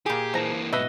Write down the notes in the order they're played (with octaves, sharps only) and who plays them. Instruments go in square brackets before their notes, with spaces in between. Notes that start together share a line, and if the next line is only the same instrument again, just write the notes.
[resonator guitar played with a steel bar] A#2 G#4 [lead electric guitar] G4
[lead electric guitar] E3 A#3 [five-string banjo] F3 A#5
[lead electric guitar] G#2 B2 [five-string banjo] F#4 B4 E5 [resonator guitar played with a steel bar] D#5